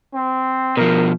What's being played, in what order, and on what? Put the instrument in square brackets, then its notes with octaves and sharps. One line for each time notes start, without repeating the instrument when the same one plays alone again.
[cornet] C4
[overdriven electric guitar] B2 F3 [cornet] A#4